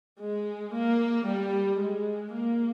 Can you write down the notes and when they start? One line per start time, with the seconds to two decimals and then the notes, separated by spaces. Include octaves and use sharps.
0.19 G#3
0.73 A#3
1.25 G3
1.78 G#3
2.32 A#3